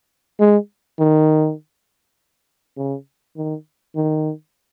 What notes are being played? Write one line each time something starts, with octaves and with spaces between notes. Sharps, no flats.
G#3
D#3
C#3
D#3
D#3